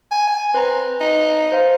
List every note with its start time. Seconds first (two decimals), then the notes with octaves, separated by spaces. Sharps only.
0.11 G#5
0.28 G#5
0.54 C4 B4 A#5
1.00 D#4
1.52 C5 F5